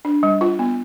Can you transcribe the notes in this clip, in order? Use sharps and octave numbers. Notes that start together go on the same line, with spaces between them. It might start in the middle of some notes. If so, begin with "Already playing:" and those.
D4
G3
F4
B3